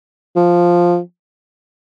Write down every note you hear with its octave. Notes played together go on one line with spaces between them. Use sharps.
F3